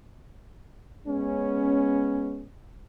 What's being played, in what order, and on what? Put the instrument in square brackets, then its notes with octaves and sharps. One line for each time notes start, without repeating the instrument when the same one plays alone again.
[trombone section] G#3 B3 C#4